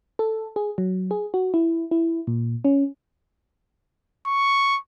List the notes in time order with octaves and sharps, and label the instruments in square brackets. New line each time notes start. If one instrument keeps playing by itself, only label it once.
[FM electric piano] A4
G#4
F#3
G#4
F#4
E4
E4
A#2
C#4
[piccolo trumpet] C#6